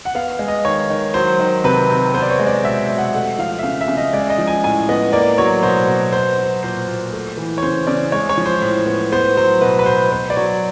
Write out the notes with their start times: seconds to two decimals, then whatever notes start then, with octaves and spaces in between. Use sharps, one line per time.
0.05 F#5
0.15 B3 F5
0.39 G#3
0.48 D#5
0.65 D#3 C#5
0.90 D#3
1.14 F#3 C5
1.39 D#3
1.64 C3 B4
1.90 C3
2.14 B3 C5
2.22 D5
2.30 C#5
2.40 G#3
2.47 D5
2.64 B2 E5
2.89 B2
2.98 F#5
3.14 A3 F#5
3.39 F3 F5
3.59 E5
3.63 C#3 F5
3.81 E5
3.88 C#3
3.97 D#5
4.13 G#3 D5
4.30 D#5
4.38 F3
4.47 G#5
4.64 A2 G#5
4.89 B3 D#5
5.13 A#3 D5
5.38 F#3 C#5
5.63 B2 C5
5.88 B2
6.12 B3 C5
6.38 F#3
6.63 A#2 C5
6.88 A#2
7.12 A3
7.38 E3
7.58 C#5
7.62 C#3 C5
7.87 C#3 D5
8.12 G#3 C#5
8.29 C#5
8.38 F3
8.46 C5
8.62 A2
8.86 B3
9.12 B3 C5
9.37 F#3 C5
9.61 B2 B4
9.79 B4
9.86 B2 C5
10.12 B3 C5
10.30 D5
10.36 F#3 C#5